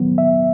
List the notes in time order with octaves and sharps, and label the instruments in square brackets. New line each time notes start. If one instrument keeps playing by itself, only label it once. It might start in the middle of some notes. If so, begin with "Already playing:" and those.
Already playing: [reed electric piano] D#2 D#3 F#3 B3
E5